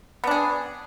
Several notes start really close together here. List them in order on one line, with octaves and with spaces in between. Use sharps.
B3 D4 G#4